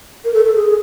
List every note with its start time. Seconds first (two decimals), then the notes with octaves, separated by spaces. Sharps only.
0.25 A#4
0.34 A4
0.45 A4
0.55 G#4